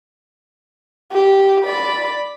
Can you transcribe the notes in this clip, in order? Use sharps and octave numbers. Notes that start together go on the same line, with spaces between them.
G4
D5 B5